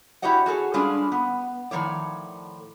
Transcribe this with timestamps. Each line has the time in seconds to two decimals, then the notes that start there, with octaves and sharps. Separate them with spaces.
0.22 E4 F#4 G4 C#5 D#5 F#5
0.46 F#4 G#4 A4 C#5
0.74 G3 G#3 C#4 D4 F4 G#4
1.12 B3
1.71 A2 D#3 F3 C#5 D5